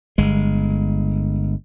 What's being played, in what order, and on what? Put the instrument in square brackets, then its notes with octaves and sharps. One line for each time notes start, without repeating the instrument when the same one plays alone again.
[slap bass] G1 G#3